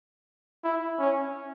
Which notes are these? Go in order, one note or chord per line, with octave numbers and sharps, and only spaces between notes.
E4
C#4